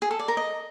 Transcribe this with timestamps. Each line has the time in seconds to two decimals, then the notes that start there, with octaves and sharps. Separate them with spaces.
0.02 G#4
0.11 A4
0.19 D5
0.28 A#4
0.37 D#5